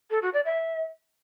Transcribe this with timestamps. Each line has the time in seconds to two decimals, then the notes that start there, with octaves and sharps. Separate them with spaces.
0.11 A4
0.22 F#4
0.34 D5
0.45 E5